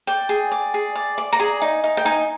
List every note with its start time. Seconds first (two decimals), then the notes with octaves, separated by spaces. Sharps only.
0.07 D5 G5
0.29 G#4
0.52 D5
0.74 G#4
0.96 D5
1.18 D5
1.33 A#5
1.40 G#4 G#5
1.62 D#4
1.84 D#4
1.97 G5
2.05 D#4 G#5